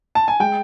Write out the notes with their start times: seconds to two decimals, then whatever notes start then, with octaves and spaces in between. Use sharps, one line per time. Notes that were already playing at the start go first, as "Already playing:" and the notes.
0.15 A5
0.28 G#5
0.40 G#3 G5